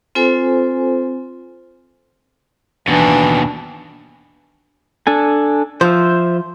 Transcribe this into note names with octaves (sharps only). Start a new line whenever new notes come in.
C4 F4 A4 C5 G#5
D#2 B2 E3 D4
D4 A4 G#5
F3 C5 E5